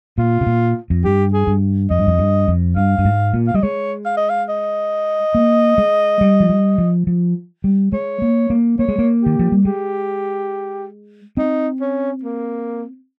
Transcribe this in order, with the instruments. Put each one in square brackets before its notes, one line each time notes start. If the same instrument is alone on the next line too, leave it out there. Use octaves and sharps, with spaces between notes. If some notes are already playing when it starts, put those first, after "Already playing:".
[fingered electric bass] A#2 [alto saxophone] F4
[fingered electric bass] C3
A#2
F2
[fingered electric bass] G2 [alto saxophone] G4
[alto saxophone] G#4
[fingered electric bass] G2
[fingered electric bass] F2 [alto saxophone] D#5
[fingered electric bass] G2
F2
G2
F2
[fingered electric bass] G2 [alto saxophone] F5
[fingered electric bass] G2
G#2
A#2
[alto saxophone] F5
[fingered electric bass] G3 [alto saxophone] D#5
[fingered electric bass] G#3 [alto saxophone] C#5
[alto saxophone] F5
D#5
F5
D#5
[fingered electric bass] A#3
G#3
G3
F3
G3
F3
F3
G3
[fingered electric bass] G#3 [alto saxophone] C#5
[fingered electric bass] A#3
A#3
[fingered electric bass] A#3 [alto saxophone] C#5
[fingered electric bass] G#3
A#3
[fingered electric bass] D#3 [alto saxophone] G4
[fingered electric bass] F3
G3
[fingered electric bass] G#3 [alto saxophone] G4
[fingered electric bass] C4 [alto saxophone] D#4
[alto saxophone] C#4
A#3